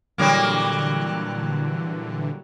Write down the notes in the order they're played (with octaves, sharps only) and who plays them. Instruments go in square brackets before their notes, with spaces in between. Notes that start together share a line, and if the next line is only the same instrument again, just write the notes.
[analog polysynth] A#2 D3 E3 [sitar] F#3 G3 A#3